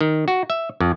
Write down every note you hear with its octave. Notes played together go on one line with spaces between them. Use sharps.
D#3
F#4
E5
F2